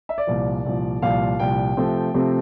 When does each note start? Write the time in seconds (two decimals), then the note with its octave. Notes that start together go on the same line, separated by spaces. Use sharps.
0.09 E5
0.18 D5
0.27 C2 A#2 F3
0.65 C2 A#2 F3
1.02 C2 A#2 F3 F5
1.39 C2 A#2 F3 G5
1.77 C3 F3 A3 C4
2.14 C3 F3 A3 C4